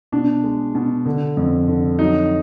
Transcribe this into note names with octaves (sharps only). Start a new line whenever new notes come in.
B2 D4
G#3
B2
D3
F2
D3
F#3 D#4